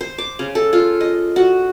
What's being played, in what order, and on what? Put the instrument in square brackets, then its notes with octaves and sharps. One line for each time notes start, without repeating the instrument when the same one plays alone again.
[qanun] C5
D6
C#3
A4
F4
D#5
F#4